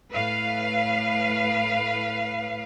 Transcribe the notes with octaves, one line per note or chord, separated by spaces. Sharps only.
A2 B4 F5